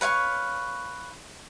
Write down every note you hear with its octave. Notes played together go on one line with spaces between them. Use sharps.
B4 C#5 F5 C#6